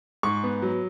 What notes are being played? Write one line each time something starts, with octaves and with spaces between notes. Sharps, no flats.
G#2 C#6
B3
F#3